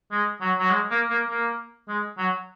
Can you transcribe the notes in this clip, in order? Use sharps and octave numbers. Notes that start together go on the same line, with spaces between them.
G#3
F#3
F#3
G#3
A#3
A#3
A#3
G#3
F#3